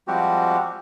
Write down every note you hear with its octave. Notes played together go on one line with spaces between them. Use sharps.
F3 G3 G#3 C4 F#4 G4